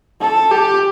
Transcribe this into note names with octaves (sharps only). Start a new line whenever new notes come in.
A4
G4